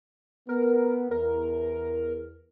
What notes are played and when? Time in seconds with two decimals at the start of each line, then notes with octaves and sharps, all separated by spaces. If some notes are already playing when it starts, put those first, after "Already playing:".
0.49 B3 A#4
1.11 E2 A#4